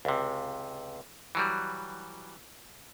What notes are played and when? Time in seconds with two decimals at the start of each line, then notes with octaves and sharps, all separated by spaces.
0.05 C#2 C3
1.35 E3 F#3 G3